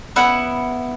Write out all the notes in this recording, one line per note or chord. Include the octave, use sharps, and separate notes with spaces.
B3 E4 F#5